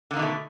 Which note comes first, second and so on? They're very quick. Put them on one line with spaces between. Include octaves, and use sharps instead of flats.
D3 A#3 D#3 B2 A3